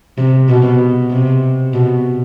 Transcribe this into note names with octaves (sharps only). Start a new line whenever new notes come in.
C3
B2
C3
B2